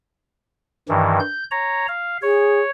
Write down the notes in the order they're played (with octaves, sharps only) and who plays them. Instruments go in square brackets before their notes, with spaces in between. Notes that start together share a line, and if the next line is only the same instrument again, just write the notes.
[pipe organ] G2 D#3 E3
G6
C#5 A#5
F5
[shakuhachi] G#4 [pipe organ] C#5